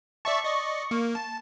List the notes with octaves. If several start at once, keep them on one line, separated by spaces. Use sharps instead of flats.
D5 E5 A5 C#6
D5 D#5
A#3
A5